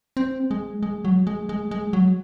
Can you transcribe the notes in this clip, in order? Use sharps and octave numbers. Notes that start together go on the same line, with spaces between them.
C4
G#3
G#3
F#3
G#3
G#3
G#3
F#3